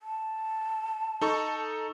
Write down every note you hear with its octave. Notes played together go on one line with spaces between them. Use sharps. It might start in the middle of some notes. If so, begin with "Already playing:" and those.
A5
D#4 A4 C#6